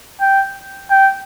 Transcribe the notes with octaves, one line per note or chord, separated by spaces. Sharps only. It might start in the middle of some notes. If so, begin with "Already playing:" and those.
G5
G5